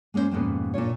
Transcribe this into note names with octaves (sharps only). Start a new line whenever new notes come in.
G#3 A#3 C#4 E4 C5
F2 G#2 B2 A#3 B3 C#4
A#2 D4 F4 C#5